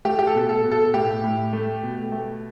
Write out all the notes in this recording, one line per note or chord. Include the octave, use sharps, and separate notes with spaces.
A3 G4
G4
A4
B2
A4
B2
A4
A2 G4
A2
A3
B2
A3